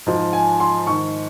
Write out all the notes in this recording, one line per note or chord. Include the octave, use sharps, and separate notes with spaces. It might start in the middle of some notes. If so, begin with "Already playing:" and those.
G#2 F3
G#5
C6
G#2 D#3 C#6